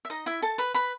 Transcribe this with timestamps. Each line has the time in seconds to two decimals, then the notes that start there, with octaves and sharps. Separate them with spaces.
0.05 E5
0.10 D#4 D#5
0.26 E4 E5
0.42 A4 A5
0.58 B4 B5
0.74 B4 B5